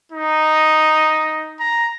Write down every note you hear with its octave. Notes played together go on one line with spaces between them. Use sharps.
D#4
A#5